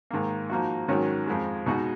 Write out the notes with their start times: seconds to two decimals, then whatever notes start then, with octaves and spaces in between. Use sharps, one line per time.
0.10 G#2 D#3 A#3
0.50 F3 A#3 D#4 F#4
0.88 G#2 D#3 F#3 C#4 F#4
1.27 F2 F3 G#3
1.66 B2 G#3 D#4 F#4